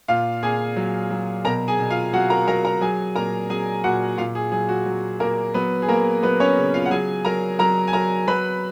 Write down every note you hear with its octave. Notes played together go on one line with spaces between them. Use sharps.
A#2 F4 F5
A#2 G#4 G#5
F#3
F#3
B2 A#4 A#5
G#4 G#5
B2
F4 F5
F#3 F#4 F#5
A#4 A#5
F#3 A#4 A#5
A#4 A#5
F#3 G#4 G#5
A#2 A#4 A#5
F#3 G#4 G#5
A#2 F#4 F#5
A#2 F4 F5
G#4
F#3 G#4
F#4
F#3
A#2 A#3 A#4
F#3 B3 B4
G#4
F#3 A#3 A#4
F#3 B3 B4
C#4 C#5
C#3
F4 F5
F#5
F#3 G#4 G#5
F#3 A#4 A#5
F#3 A#4 A#5
G#5
F#3 A#4 A#5
F#3 B4 B5